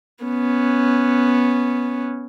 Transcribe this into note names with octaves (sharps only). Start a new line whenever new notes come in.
B3 C#4